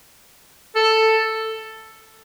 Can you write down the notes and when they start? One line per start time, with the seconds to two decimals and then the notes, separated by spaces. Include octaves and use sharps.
0.76 A4